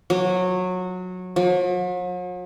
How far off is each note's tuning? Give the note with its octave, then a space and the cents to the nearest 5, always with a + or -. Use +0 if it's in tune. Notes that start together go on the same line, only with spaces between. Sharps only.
F#3 -20
F#3 -45